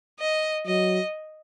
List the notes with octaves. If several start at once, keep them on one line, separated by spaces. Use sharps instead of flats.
D#5
F#3 D#5